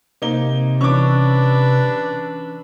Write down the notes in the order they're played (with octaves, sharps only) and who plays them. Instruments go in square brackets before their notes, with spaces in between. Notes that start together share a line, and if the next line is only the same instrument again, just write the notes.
[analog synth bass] C3 [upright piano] A#3 D#4 G7
[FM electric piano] E3 C#4 E6 [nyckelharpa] D4 B4 [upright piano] C#6 D6